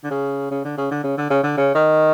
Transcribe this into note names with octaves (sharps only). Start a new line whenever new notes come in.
D3
C#3
C#3
D3
C#3
D3
C#3
D3
C#3
D3
C#3
D#3